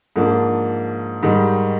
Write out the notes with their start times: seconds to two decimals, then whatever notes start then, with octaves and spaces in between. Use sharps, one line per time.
0.16 G#2 F3 A#3 D4
1.23 G#2 D#3 G3